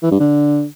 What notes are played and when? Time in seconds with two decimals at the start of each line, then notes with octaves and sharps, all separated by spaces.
0.03 E3
0.11 G2
0.20 D3